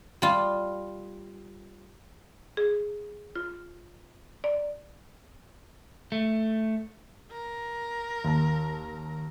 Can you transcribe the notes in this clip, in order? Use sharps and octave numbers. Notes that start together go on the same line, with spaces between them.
G3 F4
G#4
F4
D5
A3
A#4
D#2 A5